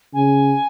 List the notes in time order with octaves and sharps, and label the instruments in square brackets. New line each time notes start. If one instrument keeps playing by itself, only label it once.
[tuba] C#3 [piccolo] G#5